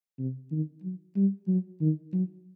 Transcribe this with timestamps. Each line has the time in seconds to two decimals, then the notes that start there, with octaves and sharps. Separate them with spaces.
0.19 C3
0.51 D#3
0.83 F#3
1.16 G3
1.48 F#3
1.81 D#3
2.13 F#3